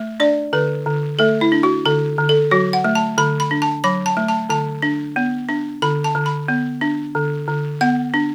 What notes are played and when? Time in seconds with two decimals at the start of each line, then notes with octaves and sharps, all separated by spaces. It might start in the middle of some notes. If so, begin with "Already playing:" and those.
Already playing: A3
0.20 D4 D5
0.53 D3 B4
0.86 D3
1.19 A3 A4
1.41 E4
1.52 D4
1.63 F#4
1.85 D3 A4
2.18 D3
2.29 A4
2.51 F#3 F#4
2.73 F#5
2.84 A3
2.95 A5
3.18 D3 B5
3.40 B5
3.51 D4
3.62 A5
3.84 F#3 B5
4.06 A5
4.17 A3
4.29 A5
4.49 D3 A5
4.82 D4
5.16 B3
5.49 D4
5.82 D3 B5
6.04 A5
6.15 D3
6.26 B5
6.48 B3
6.81 D4
7.15 D3
7.48 D3
7.81 B3 F#5
8.14 D4